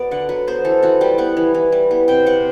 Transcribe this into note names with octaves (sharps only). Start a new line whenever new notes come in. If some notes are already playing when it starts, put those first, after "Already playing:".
Already playing: F#3 B3 B4 D5
D3 F#5
F#3 B4
B3 C5
E3 A4
E3 F#4
G3 G4
B3 F#5
E3
E3
G3
B3
C3 G5
C3 F#5